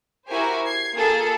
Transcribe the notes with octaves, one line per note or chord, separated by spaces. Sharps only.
E4 F#4 G4 A#4 C5 G#5
G#6 C7
A#3 F4 G#4 A4